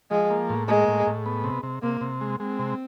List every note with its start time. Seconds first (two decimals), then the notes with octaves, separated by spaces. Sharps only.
0.11 F3 G#3
0.30 A#3
0.50 A2
0.68 G#3 A#3
0.88 A2
1.07 A2
1.26 B3
1.44 C3
1.63 C3
1.82 C3 A#3
2.01 C3
2.21 G#3
2.40 G#3 C4
2.59 C3